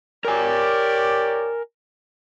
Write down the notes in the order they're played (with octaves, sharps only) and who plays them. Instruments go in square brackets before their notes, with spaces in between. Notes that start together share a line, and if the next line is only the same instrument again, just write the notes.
[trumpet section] G4 C#5 D5 [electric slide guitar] A#4 G#5